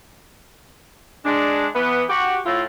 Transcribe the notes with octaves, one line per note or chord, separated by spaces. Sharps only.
G#3 D4
E3 B3
F#4 G4
A2 A3 E4 F4